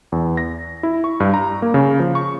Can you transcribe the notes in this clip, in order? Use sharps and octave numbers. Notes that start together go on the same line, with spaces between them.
E2
A#6
E4
C#6
G2
A#5
A#3
C#3
F3
C#6